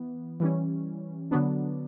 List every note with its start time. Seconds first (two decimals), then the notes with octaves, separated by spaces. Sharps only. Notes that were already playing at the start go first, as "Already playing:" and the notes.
Already playing: E3 B3
0.40 E3 G3 C#4
1.31 D3 F#3 B3 D4